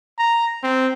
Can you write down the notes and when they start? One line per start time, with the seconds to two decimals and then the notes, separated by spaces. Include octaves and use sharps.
0.18 A#5
0.63 C4